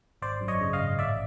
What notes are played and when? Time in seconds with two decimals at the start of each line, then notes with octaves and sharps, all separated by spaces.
0.22 G#1 C5 D5
0.41 F#2
0.48 C#5 D#5
0.61 C#3
0.73 D#5 F5
0.80 G#1
0.99 A1 D5 E5